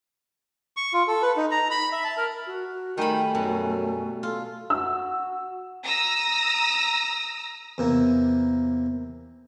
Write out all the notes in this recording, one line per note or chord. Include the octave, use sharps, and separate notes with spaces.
C#6
F4
A4
B4
D#4
A#5
B5
E5
A5
A#4
F#4
D#3 G3 A3 G#5 B5
F#2 B2
F4 A4
F#4 E6
A#5 D#6 E6 A#6
E2 C3 A#3